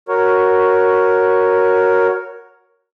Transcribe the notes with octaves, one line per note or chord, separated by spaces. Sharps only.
F#4 A#4 C#5